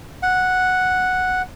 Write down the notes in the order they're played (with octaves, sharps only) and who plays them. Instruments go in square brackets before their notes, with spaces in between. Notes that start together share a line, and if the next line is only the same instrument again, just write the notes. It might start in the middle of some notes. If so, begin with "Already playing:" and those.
[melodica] F#5